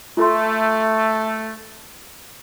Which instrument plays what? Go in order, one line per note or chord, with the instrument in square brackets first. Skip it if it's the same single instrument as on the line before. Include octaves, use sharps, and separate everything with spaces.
[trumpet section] A3 [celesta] F4 A4 C6